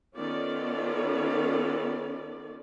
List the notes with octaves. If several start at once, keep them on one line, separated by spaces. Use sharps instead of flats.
D#3 B3 C#4 F4 A4 D5